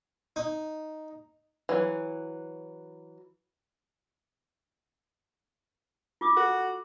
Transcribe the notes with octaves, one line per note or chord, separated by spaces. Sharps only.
D#4
E3 F#3
F4 D6 D#6
F#4 A4